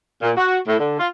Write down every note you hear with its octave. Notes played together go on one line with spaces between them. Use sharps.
A#2
F#4
A2
D3
F4